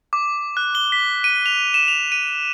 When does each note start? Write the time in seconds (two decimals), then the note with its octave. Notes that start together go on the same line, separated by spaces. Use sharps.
0.13 D6
0.57 F#6
0.75 G7
0.92 B6
1.24 D#7
1.46 F7
1.74 E7
1.88 F7
2.12 D#7